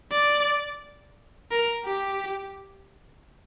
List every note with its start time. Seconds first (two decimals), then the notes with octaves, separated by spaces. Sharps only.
0.12 D5
1.51 A#4
1.85 G4